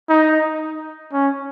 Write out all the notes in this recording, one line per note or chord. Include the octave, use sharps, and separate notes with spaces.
D#4
C#4